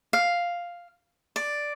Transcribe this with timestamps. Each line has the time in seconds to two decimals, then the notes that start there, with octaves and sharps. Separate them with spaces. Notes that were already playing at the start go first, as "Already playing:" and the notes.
0.13 F5
1.36 D5